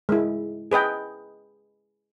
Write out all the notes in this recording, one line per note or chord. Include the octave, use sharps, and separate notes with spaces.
G#3 E4
G#4 B4 D#5 G5